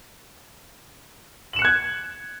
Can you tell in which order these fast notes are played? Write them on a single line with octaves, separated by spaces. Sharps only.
F#7 E7 C#7 F#6 G#6